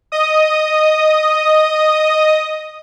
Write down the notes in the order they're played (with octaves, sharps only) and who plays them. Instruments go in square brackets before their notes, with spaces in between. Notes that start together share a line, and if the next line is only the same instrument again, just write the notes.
[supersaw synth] D#5 D#6